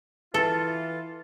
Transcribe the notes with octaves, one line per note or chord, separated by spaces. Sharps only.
E3 F4 A4